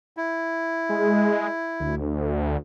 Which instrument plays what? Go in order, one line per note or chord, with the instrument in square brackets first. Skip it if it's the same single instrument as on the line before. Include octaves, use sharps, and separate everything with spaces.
[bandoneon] E4
[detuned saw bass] G#3
D2